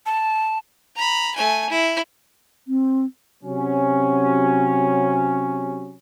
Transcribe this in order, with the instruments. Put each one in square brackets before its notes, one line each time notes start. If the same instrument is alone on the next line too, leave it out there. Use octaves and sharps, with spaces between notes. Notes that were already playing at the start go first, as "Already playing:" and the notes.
[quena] A5
[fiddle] A#5 B5
A3 G#5
E4
[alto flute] C4
[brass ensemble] C3 F#3 C#4